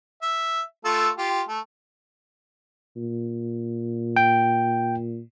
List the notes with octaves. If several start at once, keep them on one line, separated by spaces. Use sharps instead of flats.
E5
A3 F4 A4
F4 G4
A3
A#2
G5